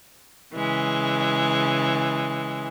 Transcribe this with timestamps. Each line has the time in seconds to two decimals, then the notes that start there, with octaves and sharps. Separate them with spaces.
0.54 C#3 E3 G#3